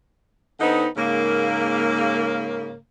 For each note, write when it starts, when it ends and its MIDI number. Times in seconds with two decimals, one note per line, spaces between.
0.60 0.86 50
0.60 0.86 59
0.60 0.86 60
0.60 0.86 63
0.97 2.75 44
0.97 2.75 49
0.97 2.75 58